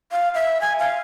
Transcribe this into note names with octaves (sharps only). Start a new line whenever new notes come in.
F5
E5
G#5
F5